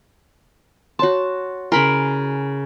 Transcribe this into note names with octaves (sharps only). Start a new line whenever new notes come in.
F#4 C#5 A5 C6
C#3 E4 A#4 G#5 B5 C6